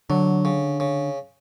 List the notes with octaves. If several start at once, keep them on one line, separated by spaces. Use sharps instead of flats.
D3 F#3
C#3
C#3